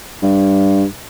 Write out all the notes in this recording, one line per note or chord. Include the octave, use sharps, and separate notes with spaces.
G2